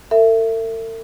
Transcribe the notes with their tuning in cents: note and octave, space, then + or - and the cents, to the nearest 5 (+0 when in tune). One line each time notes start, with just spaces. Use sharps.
A4 +45 E5 +15